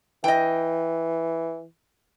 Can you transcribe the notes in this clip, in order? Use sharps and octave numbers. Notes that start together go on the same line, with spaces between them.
E3 D#5 G5